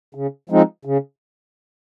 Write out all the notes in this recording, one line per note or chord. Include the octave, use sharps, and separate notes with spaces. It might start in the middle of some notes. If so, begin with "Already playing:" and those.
C#3
F3 G#3 C4 D#4
C#3